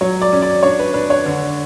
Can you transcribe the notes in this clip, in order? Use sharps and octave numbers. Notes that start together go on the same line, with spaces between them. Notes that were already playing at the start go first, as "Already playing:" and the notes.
F#3 C#5
D5
C#4
D5
D4 C#5
B4
D4 B4
C#5
D3